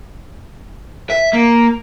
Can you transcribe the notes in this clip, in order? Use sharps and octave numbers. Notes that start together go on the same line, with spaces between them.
E5
A#3